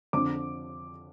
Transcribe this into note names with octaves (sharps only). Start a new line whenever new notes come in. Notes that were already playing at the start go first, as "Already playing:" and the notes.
F2 D3 D6